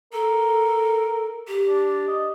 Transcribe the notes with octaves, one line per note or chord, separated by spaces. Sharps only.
A4 A#4
G4
D4
D#5